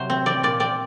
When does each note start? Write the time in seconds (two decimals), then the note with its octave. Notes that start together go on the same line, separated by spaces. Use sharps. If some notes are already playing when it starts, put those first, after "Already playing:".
Already playing: C3 F#3 C5
0.10 C4
0.26 C4 D5
0.43 A#2 D5
0.60 C4 D5